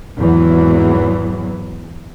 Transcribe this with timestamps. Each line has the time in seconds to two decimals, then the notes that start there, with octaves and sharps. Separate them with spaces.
0.18 G#1 E2 E3 F#3